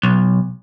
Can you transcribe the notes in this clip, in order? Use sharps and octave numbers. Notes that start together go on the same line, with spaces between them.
B1